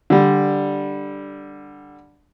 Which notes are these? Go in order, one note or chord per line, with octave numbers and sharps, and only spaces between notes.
D3 G3